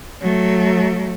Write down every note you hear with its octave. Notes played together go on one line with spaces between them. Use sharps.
F#3 A3